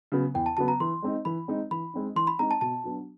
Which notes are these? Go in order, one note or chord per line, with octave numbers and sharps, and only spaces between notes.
C#3 F#3 B3
E2 G5
A5
C#3 F#3 B3 A5
A#5
E3 C6
G#3 C4 D#4
E3 B5
G#3 C4 D#4
E3 B5
G#3 C4 D#4
E3 C6
B5
G#3 C4 D#4 A#5
A5
B2 A5
F#3 B3 D4 F#4